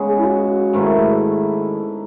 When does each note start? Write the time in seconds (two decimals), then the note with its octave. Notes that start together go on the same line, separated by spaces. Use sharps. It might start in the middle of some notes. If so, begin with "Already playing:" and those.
Already playing: C#3 G#3 B3
0.08 G#4
0.18 E4
0.25 F#4
0.73 G#2 D#3 A3 E4